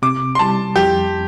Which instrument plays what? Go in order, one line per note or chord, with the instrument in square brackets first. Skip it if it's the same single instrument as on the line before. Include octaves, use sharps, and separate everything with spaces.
[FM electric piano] C3 [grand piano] D6
[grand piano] C6
[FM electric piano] G3 [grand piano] A5
[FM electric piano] F2 [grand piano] G4